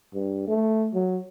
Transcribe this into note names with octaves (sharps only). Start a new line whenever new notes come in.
G2
A3
F#3